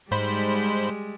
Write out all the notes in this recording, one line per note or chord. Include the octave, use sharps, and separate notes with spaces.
G#2 G3 G#3 C5 B5